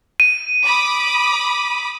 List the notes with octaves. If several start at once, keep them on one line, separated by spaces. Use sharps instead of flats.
D#7
B5 D6 D#6